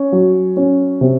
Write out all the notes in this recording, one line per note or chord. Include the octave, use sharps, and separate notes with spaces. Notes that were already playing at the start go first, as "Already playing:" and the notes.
Already playing: C#4
F#3
C#4
C3